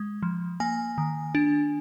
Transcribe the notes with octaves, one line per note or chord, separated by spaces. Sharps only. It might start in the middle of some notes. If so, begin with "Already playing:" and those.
Already playing: G#3
F3
A#3 G#5
D#3
D4